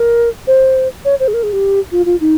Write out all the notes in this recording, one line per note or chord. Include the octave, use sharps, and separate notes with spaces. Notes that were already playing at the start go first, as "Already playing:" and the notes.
Already playing: A#4
C5
C#5
C5
G#4
A#4
G#4
G4
F4
F4
D#4